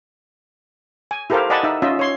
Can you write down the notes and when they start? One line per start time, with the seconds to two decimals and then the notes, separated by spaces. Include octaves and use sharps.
1.11 G#5
1.30 E4 G4 A4 A#4 C5 F5
1.50 D5 D#5 F#5 G#5 A5 B5
1.63 D#4 E5
1.82 C#4 F4 D#5 E5
1.99 C#5 C6